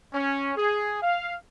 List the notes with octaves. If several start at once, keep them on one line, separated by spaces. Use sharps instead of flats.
C#4
G#4
F5